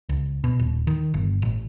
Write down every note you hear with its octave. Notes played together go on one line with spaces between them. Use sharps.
C#2
B2
D#1
D#3
G1
A1